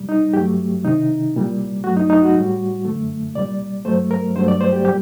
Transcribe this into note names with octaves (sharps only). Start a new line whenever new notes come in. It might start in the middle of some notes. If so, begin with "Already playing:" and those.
Already playing: C2 A#2 G3
D#4
G2 F#3 A3 G4
C2 C3 D#3 D#4
C2 A#2 G3
G2 F#3 A3 F#4
D#4
D#4
F#4
A2 G3
F#2 D3 A3
C2 A#2 G3 D5
G2 F#3 A3 C5
A#4
G2 F#3 A3 C5
D5
C5
G4
A#2 G3 G4